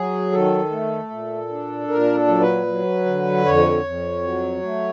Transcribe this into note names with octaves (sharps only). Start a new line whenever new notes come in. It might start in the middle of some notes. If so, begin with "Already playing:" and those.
Already playing: F#3 G#4
D#3 A4
A3
A#2
D4
A#2 A#4
A4
F#3
B4
F#3
D3
F2 C#5
F2
F#3
A3